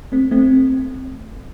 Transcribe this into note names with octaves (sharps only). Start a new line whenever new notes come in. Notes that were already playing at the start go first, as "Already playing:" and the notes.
A3 C4
A3 C4